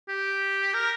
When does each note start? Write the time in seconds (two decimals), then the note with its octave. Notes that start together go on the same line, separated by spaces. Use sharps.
0.08 G4
0.74 A#4